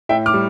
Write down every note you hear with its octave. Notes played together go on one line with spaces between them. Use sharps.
A2 E5 G5
D6 F6
G3